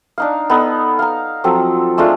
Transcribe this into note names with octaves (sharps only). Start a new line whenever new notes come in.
D4 D#4 F5
B3 D#4 A4
F5 A#5
F3 F#3 C4 A4
G#3 A3 D4 F4